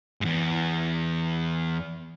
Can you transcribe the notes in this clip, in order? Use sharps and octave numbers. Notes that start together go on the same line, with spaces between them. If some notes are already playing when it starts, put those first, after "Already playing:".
E2 G#2